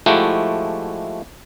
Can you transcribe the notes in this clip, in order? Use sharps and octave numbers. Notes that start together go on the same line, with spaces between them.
F3 G#3 A3 E4 F#4 G4